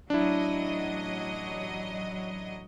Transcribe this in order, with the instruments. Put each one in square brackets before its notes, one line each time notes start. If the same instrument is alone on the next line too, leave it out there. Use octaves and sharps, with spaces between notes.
[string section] A1 F#3 D#5 [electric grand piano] D4 E4